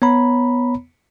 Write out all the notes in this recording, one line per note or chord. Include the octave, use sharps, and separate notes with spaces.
B3 C#5 A#5 B5